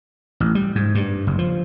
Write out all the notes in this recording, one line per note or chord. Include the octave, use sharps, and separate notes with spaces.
A1
G3
G#2
G2
F#1
F3